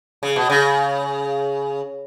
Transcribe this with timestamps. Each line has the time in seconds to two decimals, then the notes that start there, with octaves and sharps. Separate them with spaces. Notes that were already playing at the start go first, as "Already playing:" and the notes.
0.23 C#3
0.36 B2
0.50 C#3